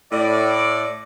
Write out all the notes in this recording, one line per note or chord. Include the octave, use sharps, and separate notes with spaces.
A2 D5